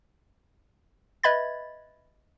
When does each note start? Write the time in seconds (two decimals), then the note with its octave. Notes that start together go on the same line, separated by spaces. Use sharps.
1.23 B4 D#5 E5 B5 G#6 A6